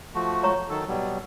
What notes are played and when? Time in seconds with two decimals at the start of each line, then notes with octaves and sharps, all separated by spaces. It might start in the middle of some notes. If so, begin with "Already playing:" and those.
0.15 F3 A3 F#4
0.43 C#5 A#5 C#6
0.70 D#3 F#3 A4
0.88 B2 F#3 G3